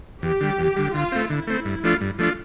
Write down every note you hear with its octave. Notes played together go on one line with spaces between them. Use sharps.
E2 G4
D3 G3
E2
D3 G3
D3 F4
A3 C4
D3 E4
A3 C4
G2
F3 A3 D4 F4
G2
F3 A3 D4 F4